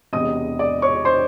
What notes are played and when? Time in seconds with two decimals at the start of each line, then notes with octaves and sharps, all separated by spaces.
0.13 E1 E2 C3 D#5 D#6
0.59 D5 D6
0.82 C#5 C#6
1.05 C5 C6